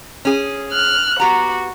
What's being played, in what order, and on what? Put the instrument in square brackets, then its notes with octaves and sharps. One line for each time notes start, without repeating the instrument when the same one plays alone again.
[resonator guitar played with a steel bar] C#4 G#4
[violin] F6 F#6
[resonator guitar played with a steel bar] B3 G4 A#5 [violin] F#4